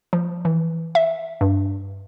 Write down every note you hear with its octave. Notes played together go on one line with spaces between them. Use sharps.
F3
E3
E5
G2